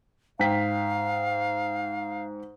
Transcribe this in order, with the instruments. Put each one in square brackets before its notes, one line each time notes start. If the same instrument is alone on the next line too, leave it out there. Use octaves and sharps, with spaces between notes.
[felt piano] G#2 G5 B6 [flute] F5